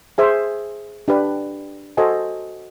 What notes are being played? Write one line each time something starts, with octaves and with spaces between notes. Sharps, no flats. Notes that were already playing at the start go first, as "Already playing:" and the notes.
G#4 C5 E5 G#5
D4 G4 B4
F#4 A4 C5 D#5 G#5